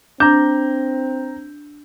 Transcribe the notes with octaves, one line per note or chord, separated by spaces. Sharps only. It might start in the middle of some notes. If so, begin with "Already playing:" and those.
C4 D4 A#5 G6